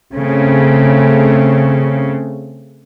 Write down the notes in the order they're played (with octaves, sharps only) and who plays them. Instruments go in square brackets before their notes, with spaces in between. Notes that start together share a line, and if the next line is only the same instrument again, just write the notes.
[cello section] C#3 [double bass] A3 C4